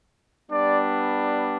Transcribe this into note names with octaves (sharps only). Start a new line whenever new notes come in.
G3 B3 D4 D5